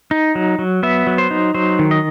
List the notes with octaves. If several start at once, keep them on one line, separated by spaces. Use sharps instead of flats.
D#4
F#3
F#3
B3 E5
F#3
C5
D#4
F#3 C5
D#3
D#5